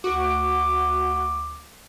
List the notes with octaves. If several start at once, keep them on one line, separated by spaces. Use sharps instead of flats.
D2 F#4 D6